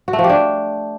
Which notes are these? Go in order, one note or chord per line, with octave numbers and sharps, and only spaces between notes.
F#4
A3
F3
G4
D4